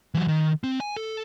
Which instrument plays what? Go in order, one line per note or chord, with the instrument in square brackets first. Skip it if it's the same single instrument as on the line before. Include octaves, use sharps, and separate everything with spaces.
[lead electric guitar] E3 F#3
D#3
C4
G#5
A4